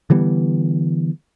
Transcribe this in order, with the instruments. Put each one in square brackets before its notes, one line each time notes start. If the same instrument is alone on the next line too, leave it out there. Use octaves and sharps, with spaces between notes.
[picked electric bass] D3 E3 G3 B3